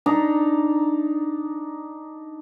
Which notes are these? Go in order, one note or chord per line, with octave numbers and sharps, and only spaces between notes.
D4 D#4 A#5